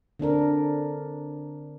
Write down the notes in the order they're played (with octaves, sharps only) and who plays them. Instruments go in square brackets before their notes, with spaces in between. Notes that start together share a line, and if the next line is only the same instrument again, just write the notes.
[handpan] D3 C4 D4 A#4